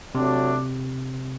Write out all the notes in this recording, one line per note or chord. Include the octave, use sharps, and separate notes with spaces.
C3 F#3 A3 D4